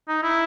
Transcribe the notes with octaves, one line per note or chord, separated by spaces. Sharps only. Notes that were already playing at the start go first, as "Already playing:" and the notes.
D#4
E4